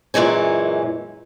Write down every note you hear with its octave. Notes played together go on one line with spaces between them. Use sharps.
F#2 A#2 E3 G#3 C#4